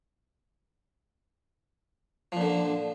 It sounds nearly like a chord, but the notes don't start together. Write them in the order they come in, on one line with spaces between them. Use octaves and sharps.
F3 A#2 D3